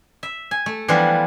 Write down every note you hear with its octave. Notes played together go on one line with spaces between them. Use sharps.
E5
G#5
A3
E3 F3 G3 B3 D4 F4